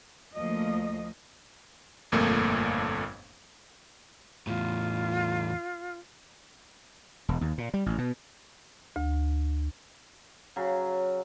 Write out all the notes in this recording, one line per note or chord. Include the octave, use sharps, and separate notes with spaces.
D2 F3 A3 A#3 D#5
G1 F2 A#2 A3 A#3
E2 A2 F4
E1
D#2
A#2
G3
A1
B2
D2
C#3 F#3